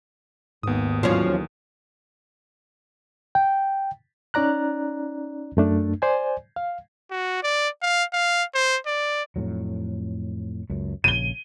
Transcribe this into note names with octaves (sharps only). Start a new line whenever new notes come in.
G#1 D#2 G#2 B3 D#6
B1 E2 F3 F#3 C#4
G5
C#4 D#4 D5 A#5 F#6
F#2 A3 D4
C5 D5 G#5
F5
F#4
D5
F5
F5
C5
D5
F2 A2 F#3
C#2 F#2
A#1 C#3 D#7 G7